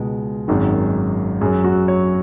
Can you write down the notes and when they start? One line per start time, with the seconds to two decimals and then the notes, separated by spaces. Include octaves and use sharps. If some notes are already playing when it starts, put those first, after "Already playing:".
Already playing: C#2 B2 G#3
0.48 G#1 F#2 D#3 G#3
1.41 F#2 G#4
1.45 F#3
1.64 F#4
1.88 C#5